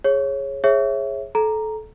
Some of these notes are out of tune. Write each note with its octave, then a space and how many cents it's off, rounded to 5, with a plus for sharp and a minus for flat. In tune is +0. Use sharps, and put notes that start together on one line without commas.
G#4 +0 C#5 -15
G#4 +0 C#5 -25 E5 +0
A4 -25 A#5 +0